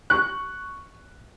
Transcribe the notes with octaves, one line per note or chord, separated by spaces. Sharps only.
C#6 F#6